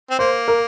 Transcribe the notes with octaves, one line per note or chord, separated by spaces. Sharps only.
C4
A#3 C5
A#4